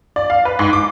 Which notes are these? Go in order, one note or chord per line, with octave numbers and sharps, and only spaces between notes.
D5
F5
B4
G#2
D6